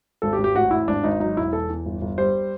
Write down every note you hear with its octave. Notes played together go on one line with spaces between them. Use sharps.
G#1 A4
G4
G#1
G4
A1 F#4
A1 E4
G#1 D4
G#1 D#4
F#3 D#4
E1 E4
E2 A4
E2
G1
G1
G3 C5